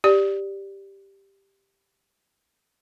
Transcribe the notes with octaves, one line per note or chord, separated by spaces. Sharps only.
G4 D5